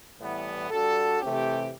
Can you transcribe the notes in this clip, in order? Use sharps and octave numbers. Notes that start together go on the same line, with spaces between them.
A2 E3 G3 B3
G3 D4 F#4 A4
C3 E3 A3 C4 G4